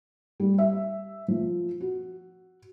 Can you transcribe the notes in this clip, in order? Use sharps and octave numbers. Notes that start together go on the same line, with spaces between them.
G3
E5
F3
F#4